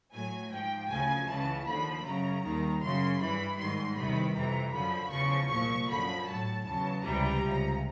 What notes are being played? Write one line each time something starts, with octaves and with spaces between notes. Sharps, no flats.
A2 F#3 G#5
G#2 F3 G5
D2 C#3 F3 G#5
C#2 C#3 E3 A5
D#2 D3 F3 B5
F#2 C#3 F#3 A#5
D#2 D#3 G3
F#2 C#3 F#3 C6
G2 E3 G3 B5
G#2 D#3 G3 C6
E2 C3 D#3 G3 B5
F2 C3 E3 A#5
F#2 D3 F3 B5
E2 C#3 F3 C#6
C2 A#2 F3 C#6
F#2 D3 F3 B5
A2 F#3 A5
E2 C#3 F#3 A5
C#2 C3 E3 G3 A#5
C#2 C3 F3